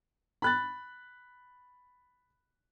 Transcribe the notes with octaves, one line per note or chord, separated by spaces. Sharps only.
B5 F#6 A6